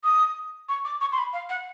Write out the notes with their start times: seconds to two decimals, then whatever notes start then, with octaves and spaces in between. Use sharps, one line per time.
0.04 D#6
0.69 C#6
0.85 D6
1.01 C#6
1.12 C6
1.18 B5
1.33 F5
1.49 F#5